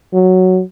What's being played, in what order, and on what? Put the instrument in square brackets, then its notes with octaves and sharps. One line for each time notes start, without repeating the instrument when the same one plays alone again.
[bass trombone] F#3